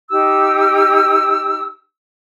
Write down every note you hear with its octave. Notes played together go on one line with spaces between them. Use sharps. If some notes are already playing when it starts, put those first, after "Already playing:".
D#4 G4 E6